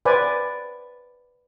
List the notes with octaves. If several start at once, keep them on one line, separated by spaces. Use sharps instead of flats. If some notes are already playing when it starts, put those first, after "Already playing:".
B4 C5 D5 G#5